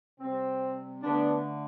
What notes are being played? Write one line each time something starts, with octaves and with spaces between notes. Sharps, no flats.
C3 G3 C4
D3 A3 B3 D4